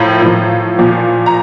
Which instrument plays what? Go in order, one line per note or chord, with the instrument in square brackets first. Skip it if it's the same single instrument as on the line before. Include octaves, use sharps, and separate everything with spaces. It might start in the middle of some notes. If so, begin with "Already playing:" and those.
Already playing: [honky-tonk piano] A2 F3 A#4
A2 F3
A#2 F3
A#5